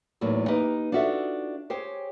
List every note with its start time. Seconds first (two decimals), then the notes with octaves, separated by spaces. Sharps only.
0.21 E2 A2 F#3 A#3 D#4
0.48 A#3 D#4 G4 B4 D#5
0.92 D4 D#4 F4 F#4 A4 E5
1.70 G4 G#4 C5 C#5 G5